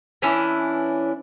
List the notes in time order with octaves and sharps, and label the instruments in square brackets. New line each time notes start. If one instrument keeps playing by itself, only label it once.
[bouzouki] E3 C#4 D4 E4